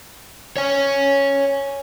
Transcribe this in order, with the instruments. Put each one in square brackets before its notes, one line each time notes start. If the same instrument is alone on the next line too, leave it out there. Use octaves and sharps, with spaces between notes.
[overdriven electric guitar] C#5 G#5